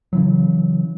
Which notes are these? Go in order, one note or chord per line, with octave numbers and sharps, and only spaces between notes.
C#3 E3 F#3